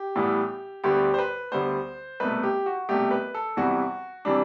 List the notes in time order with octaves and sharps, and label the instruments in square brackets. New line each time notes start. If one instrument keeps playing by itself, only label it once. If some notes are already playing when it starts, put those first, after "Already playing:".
Already playing: [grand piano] G4
A2 E3 G3 B3
D2 D3 G3 B3 G4
C5
B4
D2 D3 G3 B3 C5
C2 B2 A3 B4
G4
F#4
C2 B2 A3 G4
B4
A4
E2 C3 E3 G3 F#4
C3 E3 G3 D4